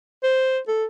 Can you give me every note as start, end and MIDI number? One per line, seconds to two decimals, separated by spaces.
0.24 0.59 72
0.68 0.85 69